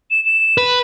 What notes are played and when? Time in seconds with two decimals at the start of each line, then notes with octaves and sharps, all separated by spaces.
0.11 E7
0.25 E7
0.58 B4